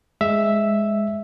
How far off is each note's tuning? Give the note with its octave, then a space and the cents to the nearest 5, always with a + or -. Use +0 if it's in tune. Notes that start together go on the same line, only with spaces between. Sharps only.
G#3 +0 E5 +0